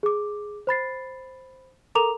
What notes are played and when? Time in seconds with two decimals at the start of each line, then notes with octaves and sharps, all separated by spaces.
0.03 G#4 D6
0.67 C5 B5 A6 C7
1.95 A4 A#4 A#5 D6 F7